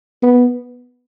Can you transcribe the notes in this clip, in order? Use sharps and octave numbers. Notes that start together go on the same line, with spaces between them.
B3